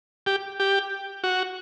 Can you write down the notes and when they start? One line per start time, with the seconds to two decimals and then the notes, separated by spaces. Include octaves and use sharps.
0.26 G4
0.60 G4
1.24 F#4